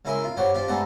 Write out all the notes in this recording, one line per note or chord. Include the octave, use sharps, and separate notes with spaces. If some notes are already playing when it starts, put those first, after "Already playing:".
C#3 G#3 E4 A#4 E5 C6
F4
G2 G4 C5 C#5 F#5
F3 D4 F4 G4
G2 G#3 A3 C5 F#5 A#5